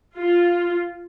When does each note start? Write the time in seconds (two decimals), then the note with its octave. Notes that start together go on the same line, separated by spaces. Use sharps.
0.17 F4